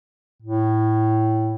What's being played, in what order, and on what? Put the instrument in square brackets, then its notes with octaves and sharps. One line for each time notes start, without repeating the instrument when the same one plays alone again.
[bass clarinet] A2